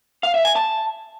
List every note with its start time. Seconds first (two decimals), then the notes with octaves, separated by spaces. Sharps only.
0.23 F5
0.34 E5
0.45 G#5
0.56 A5